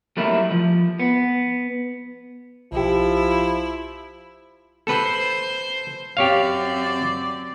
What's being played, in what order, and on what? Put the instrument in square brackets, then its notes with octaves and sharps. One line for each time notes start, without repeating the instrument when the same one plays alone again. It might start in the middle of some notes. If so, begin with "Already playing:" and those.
[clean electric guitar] F#3 G3 A3 A#3 E4
F3
B3
[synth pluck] B1 G4 [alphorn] F3 [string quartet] E4
[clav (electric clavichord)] A4 B4 [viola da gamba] C5
[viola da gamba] F#2 C4 D5 [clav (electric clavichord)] G4 C#5 F5